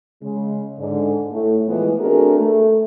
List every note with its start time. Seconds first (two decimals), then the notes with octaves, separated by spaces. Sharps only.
0.23 C#3 G#3
0.78 G#2 D3
1.32 A2 A3
1.68 E3 F3 G#3 A3 B3
2.00 A3 C4 D4 F#4 G#4 A#4
2.40 A3